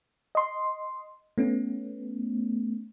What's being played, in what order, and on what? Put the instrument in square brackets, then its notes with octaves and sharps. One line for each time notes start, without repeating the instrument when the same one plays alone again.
[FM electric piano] D#5 C6
A3 B3 C#4